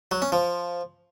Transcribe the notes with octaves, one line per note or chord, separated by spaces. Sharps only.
F#3
C#4
F3